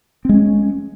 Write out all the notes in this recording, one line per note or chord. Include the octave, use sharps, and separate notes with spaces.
G#3 C4 C#4